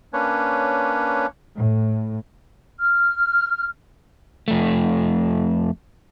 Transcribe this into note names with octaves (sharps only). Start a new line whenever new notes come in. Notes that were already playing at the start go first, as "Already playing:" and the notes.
A#3 C#4 D4 B4 C#5
A2
F6
F2 A3